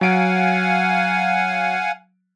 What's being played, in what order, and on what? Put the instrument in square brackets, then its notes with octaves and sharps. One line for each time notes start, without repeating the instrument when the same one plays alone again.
[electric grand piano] F#3 D7 [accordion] F5 F#5 G#5